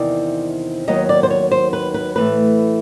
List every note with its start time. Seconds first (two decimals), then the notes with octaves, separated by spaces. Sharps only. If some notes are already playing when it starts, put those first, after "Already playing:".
Already playing: E2 C3 D#3 C4 D5
0.87 D#2 D#3 F#3 B3 D#5
1.09 D5
1.23 C5
1.30 C#5
1.52 C5
1.73 B4
1.94 B4
2.16 A2 E3 A3 B4